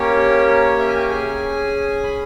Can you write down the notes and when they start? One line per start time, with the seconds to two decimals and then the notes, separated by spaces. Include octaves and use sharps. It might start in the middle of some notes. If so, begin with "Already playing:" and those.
Already playing: A#3 C#4 G4 C#5
0.47 C#5
0.79 E5
0.89 G#5
0.95 G5
1.10 C#4 G#4 G#5
2.04 B5